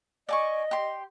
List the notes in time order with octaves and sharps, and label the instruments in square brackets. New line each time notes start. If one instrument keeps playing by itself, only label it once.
[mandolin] D5 G#5 C#6 [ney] D#5
[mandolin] G4 C6